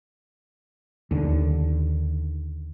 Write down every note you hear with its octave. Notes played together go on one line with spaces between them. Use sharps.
D#2 D3